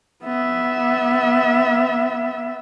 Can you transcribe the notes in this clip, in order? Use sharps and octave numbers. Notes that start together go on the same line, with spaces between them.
B3 E5